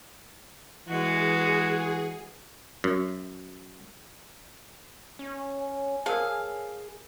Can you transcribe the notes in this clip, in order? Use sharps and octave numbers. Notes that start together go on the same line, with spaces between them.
E3 G#3 F#4 G#4
F#2
C#4
C#5 G#5
G#4 A#4 C5 F5 A5